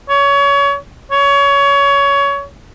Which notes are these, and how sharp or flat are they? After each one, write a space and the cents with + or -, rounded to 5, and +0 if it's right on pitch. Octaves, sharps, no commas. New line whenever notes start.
C#5 +25
C#5 +20